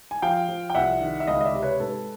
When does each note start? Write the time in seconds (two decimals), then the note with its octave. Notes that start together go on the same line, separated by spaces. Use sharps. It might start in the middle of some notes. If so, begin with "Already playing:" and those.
0.11 G#5
0.22 F3 F5 G5
0.48 F3
0.70 G5
0.75 C2 E5 F#5
1.01 D#3
1.20 E5
1.27 C#2 D#5 F5
1.41 D#5
1.45 D5 E5
1.54 C3
1.62 B4 C#5
1.80 G#2 A4 B4